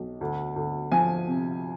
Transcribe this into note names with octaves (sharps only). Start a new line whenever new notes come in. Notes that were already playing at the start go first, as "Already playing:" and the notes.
Already playing: B1
D2
D2
F3 G#5
C3